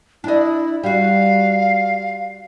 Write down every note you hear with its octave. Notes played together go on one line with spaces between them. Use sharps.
D4 E4 D#5
G3 F#4 F5